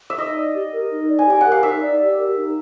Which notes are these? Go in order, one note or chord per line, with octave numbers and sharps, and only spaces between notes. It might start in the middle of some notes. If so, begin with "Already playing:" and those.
E5
D#4 D#5
D5
G4
A#4
D#4
D5
G#5
G4 G5
A#4 F#5
F5
D#4 E5
D5
G4
A#4
D#4